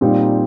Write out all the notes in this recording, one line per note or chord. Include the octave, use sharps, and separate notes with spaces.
A#2 G3 C4 D#4